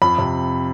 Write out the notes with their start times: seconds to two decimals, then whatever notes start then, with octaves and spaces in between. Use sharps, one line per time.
0.02 F2 B5
0.18 C3